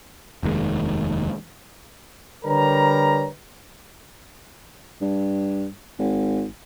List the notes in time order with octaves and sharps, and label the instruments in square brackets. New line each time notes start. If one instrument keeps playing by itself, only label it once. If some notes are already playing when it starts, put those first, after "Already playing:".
[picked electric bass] F1 D#2 D#3 G#3
[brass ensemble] D3 G3 A#4 B4 C#5 A#5
[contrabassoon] G2
G#1